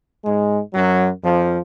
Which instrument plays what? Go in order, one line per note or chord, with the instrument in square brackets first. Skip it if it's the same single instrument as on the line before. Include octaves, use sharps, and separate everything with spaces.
[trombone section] G#2 G#3
F#2 F#3
F2 F3